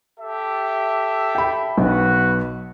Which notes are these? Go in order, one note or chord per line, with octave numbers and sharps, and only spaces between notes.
G4 A4 E5
G5 B5
B1 F#4 B4